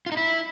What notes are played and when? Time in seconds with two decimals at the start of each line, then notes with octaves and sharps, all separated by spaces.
0.06 F4
0.12 D#4
0.17 E4